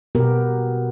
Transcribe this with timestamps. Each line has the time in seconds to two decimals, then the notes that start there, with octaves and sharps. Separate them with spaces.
0.15 B2 B3 G4 A#4